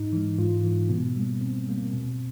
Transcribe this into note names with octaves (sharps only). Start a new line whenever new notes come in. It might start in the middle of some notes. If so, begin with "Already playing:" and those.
Already playing: G#2 D#4
E3 G#3
G#2 F4
E3 G#3
B2 B3
G3 A#3
B2 C4
G3 A#3
B2